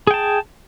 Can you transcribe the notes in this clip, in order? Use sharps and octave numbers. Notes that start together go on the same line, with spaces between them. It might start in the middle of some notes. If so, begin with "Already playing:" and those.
G#4 G5 A5